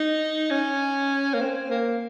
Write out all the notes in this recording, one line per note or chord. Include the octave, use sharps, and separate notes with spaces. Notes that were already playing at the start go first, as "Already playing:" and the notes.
Already playing: D#4
C#4
A#3
C4
A#3